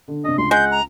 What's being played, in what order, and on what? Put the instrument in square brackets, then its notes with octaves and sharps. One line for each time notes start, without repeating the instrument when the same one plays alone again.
[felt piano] D3
[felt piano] C3 D4 [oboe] D#5
[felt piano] C#2 [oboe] C6
[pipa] G#3 [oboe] F#5 [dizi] G6
[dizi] A#5